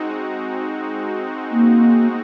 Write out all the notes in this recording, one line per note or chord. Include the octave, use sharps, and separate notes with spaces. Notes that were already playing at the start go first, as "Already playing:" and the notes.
Already playing: G#3 C4 D#4 F#4
A#3